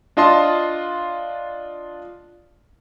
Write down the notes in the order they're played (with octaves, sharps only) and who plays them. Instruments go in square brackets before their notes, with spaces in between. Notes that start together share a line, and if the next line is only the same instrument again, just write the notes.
[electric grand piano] D4 F4 D#5 A5 C6